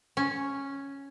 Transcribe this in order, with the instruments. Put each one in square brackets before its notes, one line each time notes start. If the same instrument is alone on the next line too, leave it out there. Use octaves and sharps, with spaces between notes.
[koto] C#4